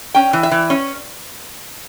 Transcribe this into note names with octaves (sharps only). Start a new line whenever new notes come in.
C#4 G5
E3
E5
E3
C#4